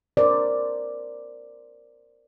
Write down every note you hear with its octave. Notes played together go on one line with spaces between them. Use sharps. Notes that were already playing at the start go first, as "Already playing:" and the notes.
A#4 C5 D5